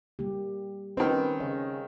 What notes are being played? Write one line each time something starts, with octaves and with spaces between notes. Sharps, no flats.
G3 A#3 G4
D#3 C4 C#4 B4
C#3 D#5